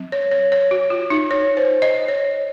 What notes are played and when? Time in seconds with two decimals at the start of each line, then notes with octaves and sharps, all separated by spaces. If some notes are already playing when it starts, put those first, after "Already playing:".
Already playing: F#3 C4
0.12 C#5
0.31 C#5
0.52 C#5
0.71 F#4
0.90 F4
1.10 D#4
1.31 C#5
1.57 C5
1.82 D#5
2.08 C#5